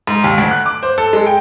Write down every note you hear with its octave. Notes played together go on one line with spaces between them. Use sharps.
G#2
D#2
D2
F#6
D6
C5
A4
G#3
G5